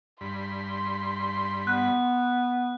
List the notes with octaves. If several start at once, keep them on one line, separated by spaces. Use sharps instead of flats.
G2 B5 C6
B3 F#6